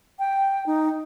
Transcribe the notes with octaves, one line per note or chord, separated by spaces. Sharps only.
G5
D#4